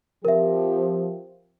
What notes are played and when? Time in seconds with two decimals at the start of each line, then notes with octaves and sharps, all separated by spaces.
0.25 F3 C4 G4 A#4 E5